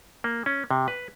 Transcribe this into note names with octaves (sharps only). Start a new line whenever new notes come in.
A#3
C#4
C3
B4